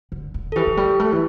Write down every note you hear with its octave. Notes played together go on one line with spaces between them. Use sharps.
D3
D3
A4
E3 G4
E3
G3
A3
E3